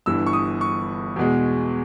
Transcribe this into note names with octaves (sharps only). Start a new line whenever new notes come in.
G1 G2 E3 E6
C#6
D#6
C#6
E2 B2 G#3